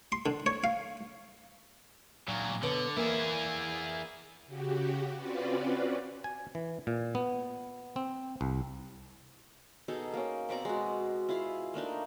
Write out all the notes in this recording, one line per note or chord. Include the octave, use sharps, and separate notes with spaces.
C6
D3
C#5
F5
A#2 F#3
B2 D3 C#5
E3 A#3 E4 G#4
C#3 F#4 G4
C4 C#4 F4 F#4 B4 D5
G#5
E3
A#2
B3
C4
C2
B2 D#4 G#4 A4
A#3 C#4
B2 C4 D5 A#5
G#3 F#4
E4 F4 G#4 F5
A3 A#3 D4 D#4